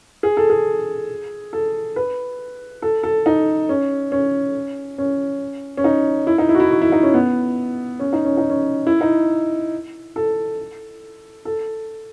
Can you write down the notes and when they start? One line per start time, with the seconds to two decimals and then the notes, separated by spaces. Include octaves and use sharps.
0.23 G#4
0.37 A4
0.50 G#4
1.53 A4
1.96 B4
2.82 A4
3.03 A4
3.26 D#4
3.69 C#4
4.12 C#4
4.98 C#4
5.77 C#4
5.84 D#4
6.27 E4
6.38 D#4
6.49 E4
6.55 F#4
6.60 E4
6.71 F#4
6.82 E4
6.92 D#4
7.03 C#4
7.14 B3
8.00 C#4
8.13 D#4
8.25 C#4
8.38 D#4
8.50 C#4
8.87 E4
9.01 D#4
10.16 A4
11.45 A4